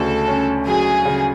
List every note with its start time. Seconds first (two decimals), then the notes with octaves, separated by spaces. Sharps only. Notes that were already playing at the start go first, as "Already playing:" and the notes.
Already playing: D2 C#3 A4
0.28 C#4
0.67 F#3 G#4
1.05 C#3